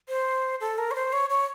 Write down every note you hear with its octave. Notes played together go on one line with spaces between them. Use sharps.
C5
A4
A#4
C#5
C5
C#5
C#5